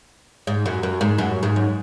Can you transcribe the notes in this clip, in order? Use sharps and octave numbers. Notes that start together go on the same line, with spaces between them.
G#2
F#2
F#2
G#2
F#2
G#2
F#2